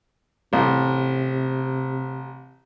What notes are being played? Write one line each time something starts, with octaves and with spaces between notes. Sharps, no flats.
A1 C3